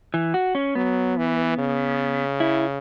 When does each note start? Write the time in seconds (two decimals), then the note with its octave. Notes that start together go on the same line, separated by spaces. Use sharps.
0.14 E3
0.34 F#4
0.55 C#4
0.75 F#3 B3
1.17 E3
1.58 C#3
2.40 E4